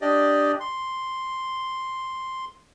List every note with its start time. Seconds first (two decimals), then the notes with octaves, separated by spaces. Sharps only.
0.01 D4 G4 D5 D#5
0.60 C6